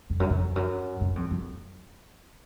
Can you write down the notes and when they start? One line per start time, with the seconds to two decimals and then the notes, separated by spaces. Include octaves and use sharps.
0.10 F2
0.20 F#2
0.30 F2
0.56 F#2
1.01 F#2
1.16 F2
1.31 F#2